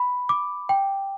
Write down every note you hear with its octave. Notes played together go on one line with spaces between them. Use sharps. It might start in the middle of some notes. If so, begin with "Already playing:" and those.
Already playing: B5
D6
G5